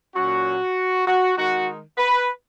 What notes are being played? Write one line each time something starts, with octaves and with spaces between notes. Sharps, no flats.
A#2 F#3 C#4 F#4
F#4
D#3 G#3 D#4 F#4
B4